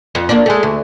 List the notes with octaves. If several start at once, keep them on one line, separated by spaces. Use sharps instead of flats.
F2
A#3 D4
G#3 A3
D2